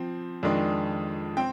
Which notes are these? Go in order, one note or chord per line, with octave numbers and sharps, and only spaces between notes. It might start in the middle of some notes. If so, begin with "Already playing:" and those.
Already playing: F3 C4
F2 D#3 G#3 D4
C4 G5